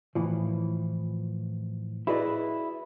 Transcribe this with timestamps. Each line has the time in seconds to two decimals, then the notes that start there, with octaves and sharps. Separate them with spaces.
0.15 A2 E3 F3
2.07 E4 F#4 G#4 B4 D5 D#5